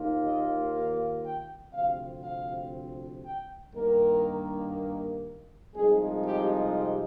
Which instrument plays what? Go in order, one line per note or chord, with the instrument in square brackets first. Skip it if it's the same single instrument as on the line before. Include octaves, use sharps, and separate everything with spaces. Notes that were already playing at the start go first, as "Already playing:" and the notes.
Already playing: [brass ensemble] D#2 D#3 A#3 F4
D#5
F5
G5
D2 C3 F3 C4 F5
F5
G5
G2 D#3 A#3 A#4
C2 C3 F3 G#3 D#4 G#4
G4
G4